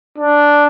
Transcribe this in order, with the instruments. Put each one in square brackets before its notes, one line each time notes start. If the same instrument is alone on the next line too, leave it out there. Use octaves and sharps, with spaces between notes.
[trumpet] D4